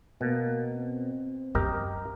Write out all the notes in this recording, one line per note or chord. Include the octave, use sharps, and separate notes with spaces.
B2 A#3
C4
F#2 G4 A#4 D#5